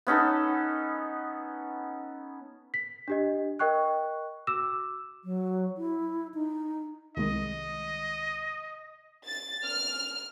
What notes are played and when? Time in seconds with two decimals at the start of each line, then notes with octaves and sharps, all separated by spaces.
0.07 B3 C#4 D#4 A4
2.74 B6
3.08 D4 G4 D#5
3.59 A#4 D#5 G5 C#6 F#6
4.47 F#4 D6 E6 E7
5.24 F#3
5.78 E4
6.34 D#4
7.17 C2 D#3 G#3 D#5
9.26 A6
9.65 F6